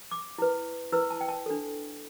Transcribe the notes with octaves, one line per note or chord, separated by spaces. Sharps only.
D6
E4 B4
E4 B4 E6
A5
G5
A5
D4 A4